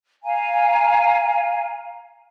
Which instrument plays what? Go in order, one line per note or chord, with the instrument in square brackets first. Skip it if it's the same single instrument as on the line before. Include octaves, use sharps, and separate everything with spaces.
[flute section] F5 G#5 A#5